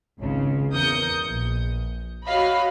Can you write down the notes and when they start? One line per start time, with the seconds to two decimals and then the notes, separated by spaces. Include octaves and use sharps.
0.20 G#1 C#2 C#3
0.71 E2 A#4 D#6 G6 C#7
1.28 A#1
2.27 F#4 C#5 D#5 F5 B5